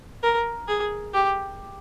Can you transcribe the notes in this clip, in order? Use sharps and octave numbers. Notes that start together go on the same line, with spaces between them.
A#4
G#4
G4